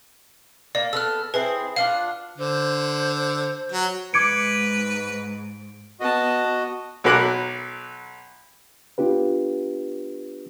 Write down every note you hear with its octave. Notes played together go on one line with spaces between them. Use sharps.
A#3 D5
B3 A4 E6 F6
C4 E4 G#4 B4
D4 F4 F5 F#5
D3 C5
F#3
G#2 B4 D6 G#6 C#7 D7
B3 F#4 D#5 A5
B1 F#3 A#4 B5 D6 F#6
B3 D4 F4 G4 B4